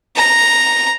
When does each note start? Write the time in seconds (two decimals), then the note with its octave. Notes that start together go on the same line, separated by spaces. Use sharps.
0.16 A#5